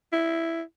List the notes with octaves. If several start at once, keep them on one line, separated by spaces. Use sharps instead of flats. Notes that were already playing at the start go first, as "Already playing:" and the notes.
E4